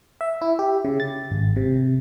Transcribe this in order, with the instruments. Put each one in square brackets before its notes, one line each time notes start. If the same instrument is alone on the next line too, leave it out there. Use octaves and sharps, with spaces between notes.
[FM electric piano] E5
E4
G4
C#3
A6
G#1
C3